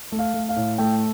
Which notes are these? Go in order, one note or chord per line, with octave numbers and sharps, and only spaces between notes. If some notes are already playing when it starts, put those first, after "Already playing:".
A3
F5
A3
F5
A2
A3 G5